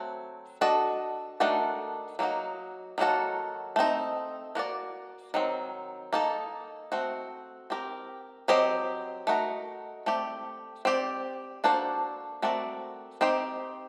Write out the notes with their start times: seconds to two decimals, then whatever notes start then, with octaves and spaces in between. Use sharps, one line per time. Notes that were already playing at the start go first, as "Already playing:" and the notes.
Already playing: F#3 A3 C4 F#4
0.61 D4 F#4 A4 D#5
1.40 D#3 A3 D4 F#4 A4
2.19 F#3 A#3 D#4 F#4
2.98 D#3 F#3 A#3 F#4 A4
3.76 A3 C4 D#4
4.55 A#3 F#4 A#4 D5
5.34 D#3 F#3 C4
6.13 A#3 D#4 A4
6.92 A3 C4 F#4
7.70 C4 G4 A#4
8.48 F#3 C4 G4 C5 D#5
9.27 A3 D#4 F#4 A#4
10.06 A3 C4 G4 D5
10.85 C4 G4 D5
11.64 A#3 D4 F#4 A4 C5
12.42 A3 C4 F#4 A#4 D5
13.21 C4 D#4 G4 C5